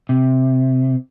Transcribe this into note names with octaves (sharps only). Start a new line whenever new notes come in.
C3